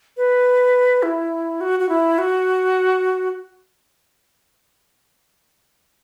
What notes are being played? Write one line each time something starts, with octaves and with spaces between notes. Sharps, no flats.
B4
E4
F#4
F#4
E4
F#4